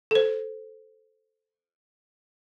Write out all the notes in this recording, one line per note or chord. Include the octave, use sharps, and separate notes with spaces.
A4 C5